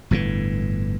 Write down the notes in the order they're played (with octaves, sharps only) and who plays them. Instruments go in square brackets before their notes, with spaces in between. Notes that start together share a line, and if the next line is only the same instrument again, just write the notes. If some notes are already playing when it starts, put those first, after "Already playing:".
[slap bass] G1 A2 D3 E3